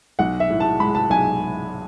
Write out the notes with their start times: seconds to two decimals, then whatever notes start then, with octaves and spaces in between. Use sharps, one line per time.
0.19 B1 F#5
0.40 E5
0.50 A2
0.60 A5
0.80 G#3 B5
0.95 A5
1.10 B1 G#5